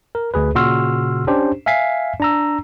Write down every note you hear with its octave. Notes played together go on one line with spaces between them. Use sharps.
A#4
D2 G#4 B4
A#2 C#3 F#4 C6 E6 F6
C#4 D4 G4 C5
E5 F5 G#5 B6 C7
D4 A#5 E6